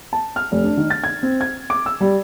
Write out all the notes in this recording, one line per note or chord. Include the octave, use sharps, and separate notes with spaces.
A5
F6
F1
D4
D#3
A6
G#6
C4
G#6
D6
E6
G3